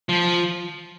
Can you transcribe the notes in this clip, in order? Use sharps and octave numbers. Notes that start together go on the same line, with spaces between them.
F3